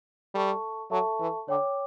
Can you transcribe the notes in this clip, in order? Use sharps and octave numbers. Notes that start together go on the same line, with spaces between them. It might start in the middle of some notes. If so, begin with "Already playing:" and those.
G3 A4 E5 A5 C#6
F#3 A4 E5 A5 C#6
E3
D3 C#5 G5 D6